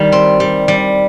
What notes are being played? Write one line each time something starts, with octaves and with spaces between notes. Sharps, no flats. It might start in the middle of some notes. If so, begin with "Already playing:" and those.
Already playing: D#3 G3
C4
G3
G3